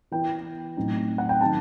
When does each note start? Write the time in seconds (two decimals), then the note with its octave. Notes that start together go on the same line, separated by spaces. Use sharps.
0.11 E3 B3 E4 G5
0.77 A2 F#3 C4 D#4
1.18 F#5
1.29 G5
1.41 D#3 F#3 C4 D#4 A5